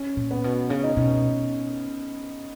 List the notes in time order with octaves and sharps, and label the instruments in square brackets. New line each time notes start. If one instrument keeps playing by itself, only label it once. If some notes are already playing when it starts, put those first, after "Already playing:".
Already playing: [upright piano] C#4
[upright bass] A#2
[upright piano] B3
[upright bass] B2
[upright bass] C#3 [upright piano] C#4
[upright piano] D#4
[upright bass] B2 [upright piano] C#4